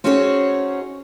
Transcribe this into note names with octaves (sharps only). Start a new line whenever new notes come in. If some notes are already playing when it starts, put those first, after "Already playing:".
C4 C#4 D#4 F#4 G#4 C#5